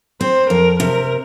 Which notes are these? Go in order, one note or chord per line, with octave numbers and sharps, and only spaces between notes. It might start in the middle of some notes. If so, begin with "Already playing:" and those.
C4 C5
F2 A#4
C3 A#4